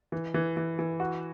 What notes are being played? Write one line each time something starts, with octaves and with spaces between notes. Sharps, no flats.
E3
E3
E3
E3
F#4